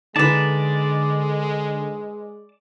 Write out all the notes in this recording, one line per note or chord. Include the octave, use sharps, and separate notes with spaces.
D3 G#3 D#4 B4 D5 A5